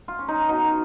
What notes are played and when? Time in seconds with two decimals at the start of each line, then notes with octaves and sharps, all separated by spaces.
0.08 F4
0.19 C#4
0.28 D#4
0.48 B2 D#4